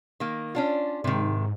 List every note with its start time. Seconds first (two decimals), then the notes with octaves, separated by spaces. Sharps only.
0.20 D#3 A#3
0.55 C#4 D4 F4
1.04 G#2 C3 D#3